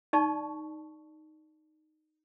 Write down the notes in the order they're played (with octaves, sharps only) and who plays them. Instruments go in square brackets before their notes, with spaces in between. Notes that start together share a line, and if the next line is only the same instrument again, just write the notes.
[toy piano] D#4 D5 A5 C#6